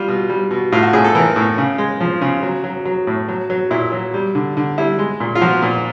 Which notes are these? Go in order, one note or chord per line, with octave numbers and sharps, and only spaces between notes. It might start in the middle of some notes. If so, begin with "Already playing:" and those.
Already playing: G3 F4
B2
G3
B2
A2 F4
F#4
A2 G#4
A4
E3 A#4
A2
C#3
G#3
F3
C#3
F#3
F#3
F#3
A2
F#3
F#3
A#2 E4
F#3
G3
D3
D3
G3 E4
G#3
A#2
F4
F3 F#4
A#2